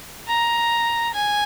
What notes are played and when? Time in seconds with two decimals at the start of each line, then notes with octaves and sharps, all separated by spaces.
0.27 A#5
1.15 G#5